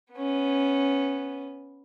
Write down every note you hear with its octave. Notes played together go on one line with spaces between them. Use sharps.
B3 C#4